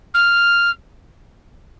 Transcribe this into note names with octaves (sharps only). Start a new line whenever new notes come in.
F6